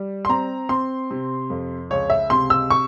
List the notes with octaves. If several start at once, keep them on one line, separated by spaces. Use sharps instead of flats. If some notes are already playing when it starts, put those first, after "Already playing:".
Already playing: G3
C6
C4 A#5
C4 C6
C3
F2
C#2 C#5
E5
C3 C6
E6
C#6